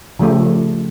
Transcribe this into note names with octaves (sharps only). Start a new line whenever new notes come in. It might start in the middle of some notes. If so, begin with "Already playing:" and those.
C#3 F3 A3 G4